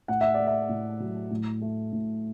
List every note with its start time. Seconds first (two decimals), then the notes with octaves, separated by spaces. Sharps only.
0.08 A2 F#5
0.21 E5
0.34 A3 D5
0.47 E5
0.69 A2
1.00 F#3
1.31 A2
1.62 A3
1.93 A2